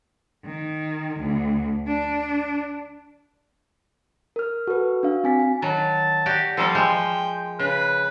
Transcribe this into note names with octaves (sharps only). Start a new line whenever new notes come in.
D#3
D2
D4
A#4 F6
F#4 A4 B4
D4 F5
C4 G#5 B6
G#5
D#3 F#3 A5
F#4 G4 D5
F3 G3 A#3 A4
F3 G#3 G5
C#3 B4